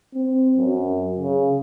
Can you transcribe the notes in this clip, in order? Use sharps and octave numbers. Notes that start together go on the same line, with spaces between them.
C4
F#2
C#3